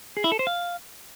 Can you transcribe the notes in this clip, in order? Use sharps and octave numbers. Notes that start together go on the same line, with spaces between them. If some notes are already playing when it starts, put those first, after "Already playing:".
G#4
E4
A4
C5
F5